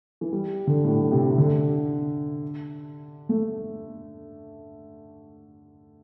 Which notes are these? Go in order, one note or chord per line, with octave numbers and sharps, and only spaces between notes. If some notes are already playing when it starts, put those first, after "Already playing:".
E3
G3
D3
A2
A2
C3
C3
D3
A3